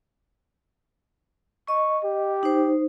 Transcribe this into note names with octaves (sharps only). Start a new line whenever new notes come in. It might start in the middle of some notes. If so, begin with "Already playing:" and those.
D#5 C#6
G4
D#4 C5